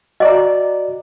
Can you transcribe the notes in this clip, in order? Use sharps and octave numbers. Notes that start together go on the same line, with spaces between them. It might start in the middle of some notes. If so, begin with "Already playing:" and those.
F#4 D5 D#5 A#5